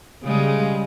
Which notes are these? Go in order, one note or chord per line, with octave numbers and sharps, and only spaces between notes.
C#3 G3 G#3